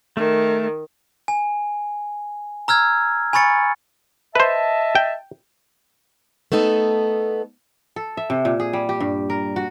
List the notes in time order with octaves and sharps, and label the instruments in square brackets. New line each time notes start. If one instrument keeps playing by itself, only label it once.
[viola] D#3 [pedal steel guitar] A3
[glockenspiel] G#5
A#5 E6 F6 G#6
G#5 B5 C#6 A6 C#7
[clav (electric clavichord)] B4 C5 [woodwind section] D#5 E5 A5
[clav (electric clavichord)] G5
[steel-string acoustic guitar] A3 B3 D#4 A4
[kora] A4
E5
C3
A#2
G#4
G3
G4
G2
A#4
F#4